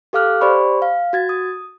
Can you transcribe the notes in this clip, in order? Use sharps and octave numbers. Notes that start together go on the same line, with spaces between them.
G4 A4 F5 D6 F6 F#6
G4 C5 D5 B5 C#6
F5
F#4 G#6 A6
D#6